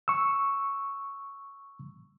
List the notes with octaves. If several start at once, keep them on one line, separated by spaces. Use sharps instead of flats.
C#6 E6